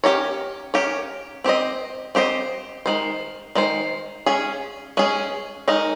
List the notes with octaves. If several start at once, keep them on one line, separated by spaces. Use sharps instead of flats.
C#4 G4 A#4 C#5
C#4 G4 A#4 C#5
C4 G4 C5 D#5
C4 G4 C5 D#5
D#3 G#3 C5
D#3 G#3 C5
G#3 C#4 G#4
G#3 C#4 G#4
G#3 D#4 A#4 D#5